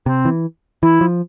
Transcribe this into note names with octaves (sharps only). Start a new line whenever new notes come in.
C3 C4
E3
E3 E4
F3